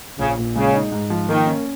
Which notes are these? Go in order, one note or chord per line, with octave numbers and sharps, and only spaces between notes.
A#1 C#3
A#2
C#3 G#3
D#4
G#2
F3
D#3 A#3
C#4